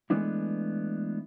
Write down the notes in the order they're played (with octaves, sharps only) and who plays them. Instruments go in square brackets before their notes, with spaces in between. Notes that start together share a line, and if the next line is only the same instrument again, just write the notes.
[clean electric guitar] E3 G#3 A3 B3 D4 E4